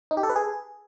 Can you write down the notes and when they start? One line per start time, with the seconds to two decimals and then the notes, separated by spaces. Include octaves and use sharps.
0.11 D#4
0.17 G4
0.23 A4
0.29 B4
0.36 G#4